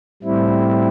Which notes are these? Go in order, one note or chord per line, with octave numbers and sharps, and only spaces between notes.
A2 G3 C4 E4